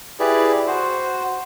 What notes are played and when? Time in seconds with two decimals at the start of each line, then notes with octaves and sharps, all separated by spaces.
0.20 E4 G4 G#4 B4 D5
0.67 F#4 C5